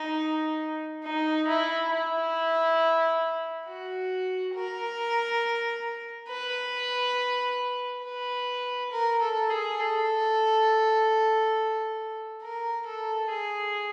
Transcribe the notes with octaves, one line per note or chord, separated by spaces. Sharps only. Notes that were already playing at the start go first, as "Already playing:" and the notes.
Already playing: D#4
D#4
E4
E4
F#4
A#4
B4
B4
A#4
A4
G#4
A4
A#4
A4
G#4